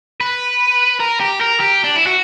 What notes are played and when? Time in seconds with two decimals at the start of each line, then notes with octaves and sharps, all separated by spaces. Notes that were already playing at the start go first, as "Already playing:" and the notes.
0.20 B4
1.00 A#4
1.20 G4
1.41 A#4
1.61 G4
1.84 D4
1.96 E4
2.07 F#4